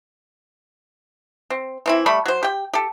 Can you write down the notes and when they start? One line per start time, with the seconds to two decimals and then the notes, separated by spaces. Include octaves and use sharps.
1.50 C4
1.86 E3 C4 E4
2.06 G3 A3 B5
2.26 F#3 C5
2.43 G4 G5
2.74 G4 A4